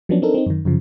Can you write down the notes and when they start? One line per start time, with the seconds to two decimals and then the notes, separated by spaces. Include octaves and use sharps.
0.09 F3 F#3 B3 C#4 D4
0.22 C4 D4 D#4 A4 A#4
0.34 C4 D#4
0.46 F#2 D#3
0.65 F#2 C#3 F3